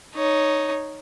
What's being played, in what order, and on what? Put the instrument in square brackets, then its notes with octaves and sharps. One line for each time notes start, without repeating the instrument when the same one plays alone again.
[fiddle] D#4 C#5